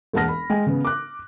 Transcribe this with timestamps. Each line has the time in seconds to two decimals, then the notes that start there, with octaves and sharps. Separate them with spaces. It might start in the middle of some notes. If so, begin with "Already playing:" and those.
0.13 E1 A#3 F#5 A5 F6 A#6
0.28 B5
0.50 G#3 G5 G#5
0.67 C#3 B3
0.85 D6 F#6